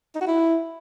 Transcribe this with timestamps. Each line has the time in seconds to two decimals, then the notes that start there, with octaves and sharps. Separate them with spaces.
0.15 D#4
0.21 F#4
0.27 E4